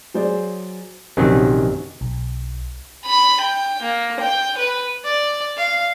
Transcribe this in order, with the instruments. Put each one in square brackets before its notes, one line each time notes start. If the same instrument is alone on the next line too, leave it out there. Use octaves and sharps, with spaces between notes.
[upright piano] F#3 G#4 C5 D5
[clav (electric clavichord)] A#1 F#2 C3 D#3 F#3 C4
[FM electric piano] B1
[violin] B5
G5
A#3
G5
B4
[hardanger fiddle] D5
F5